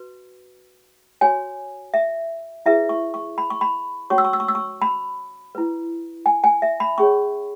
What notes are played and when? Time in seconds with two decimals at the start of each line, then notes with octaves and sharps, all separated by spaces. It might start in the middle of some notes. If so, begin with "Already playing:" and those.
Already playing: F#4 B4
1.21 F#4 C#5 G#5
1.94 E5
2.66 E4 G#4 B4 E5
2.89 C#6
3.14 C#6
3.38 B5
3.50 C#6
3.61 B5
4.10 C#4 F#4 C#5 C#6
4.18 E6
4.25 C#6
4.33 E6
4.40 C#6
4.48 E6
4.55 C#6
4.82 B5
5.55 E4 B4
6.26 G#5
6.44 G#5
6.62 E5
6.80 B5
6.98 C#4 G#4 C#5 C#6